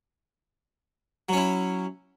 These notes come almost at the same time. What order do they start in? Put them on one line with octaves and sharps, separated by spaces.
F#3 C#4 E4